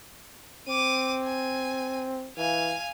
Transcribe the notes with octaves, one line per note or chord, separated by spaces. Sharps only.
C4 D6 D#7
G#5
E3 F5 G#5